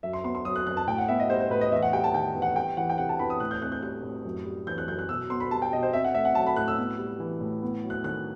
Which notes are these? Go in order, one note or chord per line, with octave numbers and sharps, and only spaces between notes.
F#2 E5
C6
B3 C6
C6
F#3 D#6
F#6
F#2 F#6
A5
A2 G5
F#5
B3 E5
D#5
G3 C5
C5
A2 B4
D#5
E2 E5
F#5
G3 G5
A5
D#3 G5
E2
F#5
G3 G5
E3 F#5
G5
C3 F#5
A5
E2 B5
D#6
A2 F#6
G6
C4 F#6
G6
G3 F#6
A2
F#2
G3
E3 G6
F#6
F#2 G6
F#6
B2 E6
B3 C6
B5
G3 A5
G5
B2 D#5
C5
C4 E5
F#5
A3 E5
F#5
F#3 A5
B5
A2 F#6
E6
B3
G3
E3
A2
B3
F#3
F#6
D#3 F#6